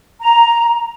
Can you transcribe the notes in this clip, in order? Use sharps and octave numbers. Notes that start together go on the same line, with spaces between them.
A#5